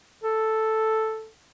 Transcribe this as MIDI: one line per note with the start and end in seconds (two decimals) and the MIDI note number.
0.24 1.29 69